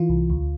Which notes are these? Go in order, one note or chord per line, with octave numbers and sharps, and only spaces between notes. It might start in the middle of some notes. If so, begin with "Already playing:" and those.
Already playing: E3 F4
C2
D2